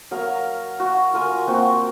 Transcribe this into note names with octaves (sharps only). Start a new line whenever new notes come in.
F#3 A#4 F5
F#4
F4 A#4 G#5
A#3 C4 F#4